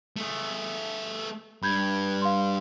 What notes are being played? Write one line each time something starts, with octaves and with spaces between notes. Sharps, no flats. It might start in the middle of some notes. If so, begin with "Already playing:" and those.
A3 G#4
G2 B5 G6 G#6
F5 C6